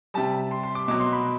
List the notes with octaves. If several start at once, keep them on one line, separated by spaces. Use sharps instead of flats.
C3 G3 A5
C6
C6
D6
B2 F#3 D6
C6
B5